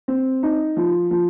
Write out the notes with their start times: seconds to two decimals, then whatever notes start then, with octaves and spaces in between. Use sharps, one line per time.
0.08 C4
0.43 D#4
0.77 F3
1.11 F3